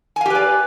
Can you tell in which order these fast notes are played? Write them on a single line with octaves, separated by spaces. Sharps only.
G#5 F5 G4 B4 D5